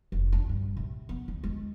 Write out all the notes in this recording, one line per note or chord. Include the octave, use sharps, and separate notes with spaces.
F1
D4
G2
C3
B3
D2
G#3